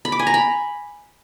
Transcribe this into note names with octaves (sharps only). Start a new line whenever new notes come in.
B5
D6
G#5
A#5
B5